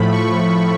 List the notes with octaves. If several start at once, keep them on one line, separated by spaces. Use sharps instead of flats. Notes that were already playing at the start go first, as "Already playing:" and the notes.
Already playing: A2 F3 A3 B5
C#6